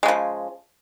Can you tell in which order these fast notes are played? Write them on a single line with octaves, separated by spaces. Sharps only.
G#3 C#3 F3